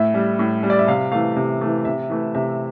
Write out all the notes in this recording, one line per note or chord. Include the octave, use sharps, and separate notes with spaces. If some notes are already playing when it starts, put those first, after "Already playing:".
Already playing: A2 E5
G3
A2
G3
D5
E5
C3 F5
E3 A3 F5
C3
E3 A3
C3 E5
E3 A3
C3 E5